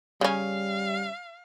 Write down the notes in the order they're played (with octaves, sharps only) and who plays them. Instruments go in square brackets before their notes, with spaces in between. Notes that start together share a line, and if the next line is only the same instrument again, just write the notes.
[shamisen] C#3 C#4 [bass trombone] G3 [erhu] F5